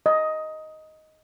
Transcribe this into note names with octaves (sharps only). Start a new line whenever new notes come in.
D#5